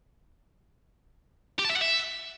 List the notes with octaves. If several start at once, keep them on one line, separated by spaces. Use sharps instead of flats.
G4
A5
E5
F#5
E5